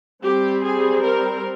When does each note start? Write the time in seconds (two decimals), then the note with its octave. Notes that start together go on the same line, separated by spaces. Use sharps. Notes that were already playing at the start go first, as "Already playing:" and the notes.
0.23 G3 C4 G4
0.64 G#4
1.04 A#4